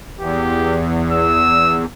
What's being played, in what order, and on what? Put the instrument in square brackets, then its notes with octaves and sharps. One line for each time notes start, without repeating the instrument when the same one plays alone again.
[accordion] E2 [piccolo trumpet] G4
[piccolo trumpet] E6